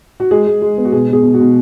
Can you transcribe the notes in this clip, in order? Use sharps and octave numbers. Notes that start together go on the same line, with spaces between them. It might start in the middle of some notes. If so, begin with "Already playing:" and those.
F#4
G#3 G#4
G#3
G#3
B3
F#4
B2 G#4
B3 G#4
B2
F#4
B2